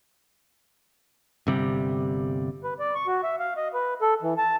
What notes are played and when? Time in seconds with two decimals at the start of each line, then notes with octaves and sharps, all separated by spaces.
1.47 G1 C3 G3
2.64 B4
2.79 D5
2.95 C#6
3.07 F#4
3.23 E5
3.39 F5
3.57 D#5
3.74 B4
4.02 A4
4.22 E3
4.38 A5